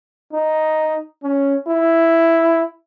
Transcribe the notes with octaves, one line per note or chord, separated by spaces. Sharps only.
D#4
C#4
E4